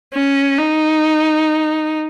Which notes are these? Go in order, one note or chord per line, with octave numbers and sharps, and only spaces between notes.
C#4
D#4